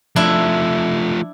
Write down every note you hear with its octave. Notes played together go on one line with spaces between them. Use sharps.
F3 A3 D4 E4